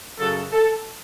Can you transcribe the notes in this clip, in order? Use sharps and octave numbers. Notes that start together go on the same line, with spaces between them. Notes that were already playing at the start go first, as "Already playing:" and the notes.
F#2 C#3 F#3 A4
A4